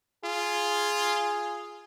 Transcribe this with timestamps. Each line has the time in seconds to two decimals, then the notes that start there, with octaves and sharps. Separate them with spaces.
0.24 F4 G#4